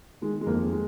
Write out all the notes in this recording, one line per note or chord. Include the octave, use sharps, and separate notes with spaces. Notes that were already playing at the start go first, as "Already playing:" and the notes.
D#3 G#3
G#3
F2 A#3
G#3